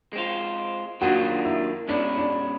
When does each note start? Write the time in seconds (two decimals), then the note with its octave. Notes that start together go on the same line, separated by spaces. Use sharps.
0.13 G#3 C4 F4
1.01 D#3 F#3 A#3 D4 F4 F#4
1.45 E4
1.88 B2 G#3 C#4 D4 E4
2.18 D4